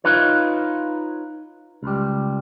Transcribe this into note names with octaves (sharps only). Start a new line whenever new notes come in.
D#4 F4 B4 C#5
C#2 G3